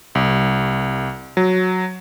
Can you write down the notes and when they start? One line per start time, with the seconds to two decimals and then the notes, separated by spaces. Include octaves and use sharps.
0.15 C2
1.37 F#3